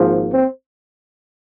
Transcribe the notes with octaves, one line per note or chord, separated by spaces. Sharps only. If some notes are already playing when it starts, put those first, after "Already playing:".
Already playing: G#1 G#2 F3 A#3
C4